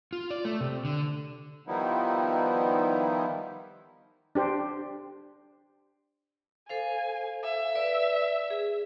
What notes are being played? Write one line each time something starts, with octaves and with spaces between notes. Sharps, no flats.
F4
D5
A3
C3
D3
D#3 F3 G3 B3 D#4 E4
D4 G4 C5
A4 C5 F5 G#5
E5
B4 D5
G#4